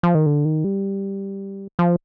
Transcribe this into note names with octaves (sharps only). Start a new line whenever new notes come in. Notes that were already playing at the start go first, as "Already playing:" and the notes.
F3
D#3
D3
D#3
G3
F3